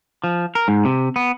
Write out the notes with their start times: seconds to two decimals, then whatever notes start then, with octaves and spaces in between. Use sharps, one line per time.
0.24 F3
0.55 A#4
0.68 G#2
0.85 C3
1.16 B3